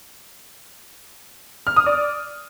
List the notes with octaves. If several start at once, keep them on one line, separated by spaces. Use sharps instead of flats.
F6
D#6
D5